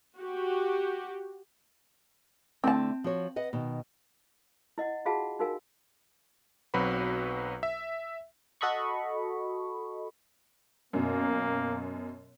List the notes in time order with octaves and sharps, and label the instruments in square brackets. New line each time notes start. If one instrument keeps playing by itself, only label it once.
[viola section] F#4 G4
[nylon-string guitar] D3 A3 E4 [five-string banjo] C4 A5
[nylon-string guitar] F3 F#4 C#5
B4 D#5 F#5
B2 D#3
[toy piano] E4 D#5 F#5
F4 F#4 G#4 F5 F#5 A5
D#4 F#4 A#4 F5 G#5
[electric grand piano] B1 F#3 C4 F#4 B4 B5
E5
[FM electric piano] F#4 A4 D#5 B5 C#6
[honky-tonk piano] F#2 B2 [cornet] A#3